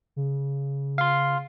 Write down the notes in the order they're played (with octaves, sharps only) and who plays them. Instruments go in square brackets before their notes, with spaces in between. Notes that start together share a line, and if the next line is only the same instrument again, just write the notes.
[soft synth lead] C#3
[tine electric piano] F5 C6